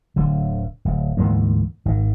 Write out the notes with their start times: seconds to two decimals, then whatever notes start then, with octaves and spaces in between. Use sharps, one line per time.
0.16 D1 D3
0.85 D1
1.17 D2 G#2 E3 A#3
1.85 G#1 D#3